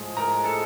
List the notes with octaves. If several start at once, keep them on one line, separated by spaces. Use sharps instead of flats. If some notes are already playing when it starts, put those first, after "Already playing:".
Already playing: A2 F3 G#3
A#4 A#5
A4 A5